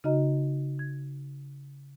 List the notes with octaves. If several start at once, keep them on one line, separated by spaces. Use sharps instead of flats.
C#3 D#4 F#4 D#5 A#5
G#6